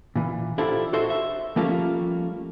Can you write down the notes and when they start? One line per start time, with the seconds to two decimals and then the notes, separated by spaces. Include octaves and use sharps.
0.16 A#2 E3
0.58 D4 E4 F4 G4 A4 C5
0.93 F#4 A4 C5 D#5 E5
1.10 E5
1.56 F3 G3 A3 A#3 C#4 F4